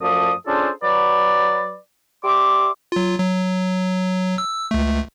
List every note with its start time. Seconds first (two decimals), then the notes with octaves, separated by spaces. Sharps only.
0.01 F#2 F3 A3 D5 D#6
0.47 C#4 D4 F4 G#4 A4 C5
0.83 F#3 B4 D5
2.24 G4 D5 E5 C6 D6
2.92 F#3 F4
3.19 F#3
4.38 E6
4.71 C#2 A3